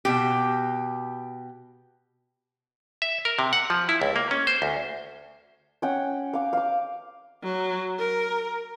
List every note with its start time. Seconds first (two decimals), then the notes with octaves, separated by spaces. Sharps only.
0.05 B2 G4
3.02 E5
3.25 A#4
3.39 C3
3.53 F#5
3.70 F3
3.89 E4
4.02 C#2
4.16 A#3
4.31 C#4
4.47 C5
4.62 D2
5.82 C#4 F#5 G5
6.33 F5 D6
6.53 F5 D6
7.44 F#3
7.99 A#4